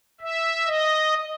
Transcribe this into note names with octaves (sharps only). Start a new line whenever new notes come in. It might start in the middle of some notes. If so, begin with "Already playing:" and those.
E5
D#5